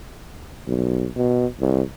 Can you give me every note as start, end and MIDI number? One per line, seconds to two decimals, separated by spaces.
0.68 1.06 35
1.16 1.46 47
1.61 1.82 36